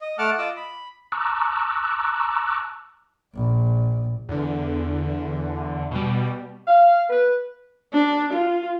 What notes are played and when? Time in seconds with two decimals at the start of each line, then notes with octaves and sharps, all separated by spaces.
0.01 D#5
0.18 A3 F#5 A5 D6 F6
0.38 F4 D#5 D6 E6
0.57 B5
1.12 A5 A#5 C#6 D6 E6 F#6
3.35 A#1
4.29 E2 D3
5.91 B2 G3
6.67 F5
7.10 B4
7.93 D4
8.33 F4